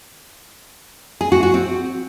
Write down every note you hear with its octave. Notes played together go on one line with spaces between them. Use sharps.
G#4
F#4
F#4
C4